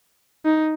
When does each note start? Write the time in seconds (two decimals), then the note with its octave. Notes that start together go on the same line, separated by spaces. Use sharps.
0.45 D#4